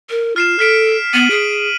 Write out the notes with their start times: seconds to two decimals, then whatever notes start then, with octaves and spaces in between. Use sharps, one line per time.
0.10 A#4
0.36 F4 F6 C7 E7
0.59 A4 F6 B6 D7
1.14 B3 D#7 F#7
1.30 G#4 D7